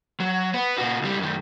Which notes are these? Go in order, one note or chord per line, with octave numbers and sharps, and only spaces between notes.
F#3
B3 B4
A#2 F#4
C#2 G3
F#2 D#3